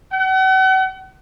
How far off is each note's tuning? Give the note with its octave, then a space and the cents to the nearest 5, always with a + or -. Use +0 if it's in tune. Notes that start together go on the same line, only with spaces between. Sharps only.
F#5 +40